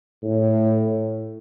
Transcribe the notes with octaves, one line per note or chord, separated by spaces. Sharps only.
A2